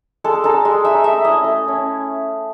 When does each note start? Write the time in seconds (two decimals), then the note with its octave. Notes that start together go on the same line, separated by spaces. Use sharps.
0.24 G#3 A4
0.44 D#4 A4
0.65 G#3
0.85 D#4 E5
1.04 A3 E5
1.25 C#4 E4 D#5
1.44 A3
1.65 C#4 E4